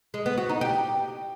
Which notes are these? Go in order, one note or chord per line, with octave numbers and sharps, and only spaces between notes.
G#3
B3
F#4
D#4
G4